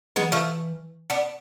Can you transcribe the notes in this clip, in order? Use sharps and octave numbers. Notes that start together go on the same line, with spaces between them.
E3 G#3 B3
F3 A3
B3 D4